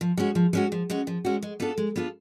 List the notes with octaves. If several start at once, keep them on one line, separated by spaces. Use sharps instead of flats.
F3
G#3 C#4 F#4
F3
G#3 C#4 F#4
F3
G#3 C#4 F#4
F3
G#3 C#4 F#4
G#3
B3 D4 F4 A4
G#3
B3 D4 F4 A4